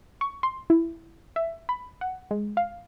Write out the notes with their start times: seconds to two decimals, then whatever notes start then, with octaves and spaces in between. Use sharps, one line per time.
0.21 C#6
0.43 C6
0.70 E4
1.36 E5
1.69 B5
2.01 F#5
2.31 G#3
2.57 F5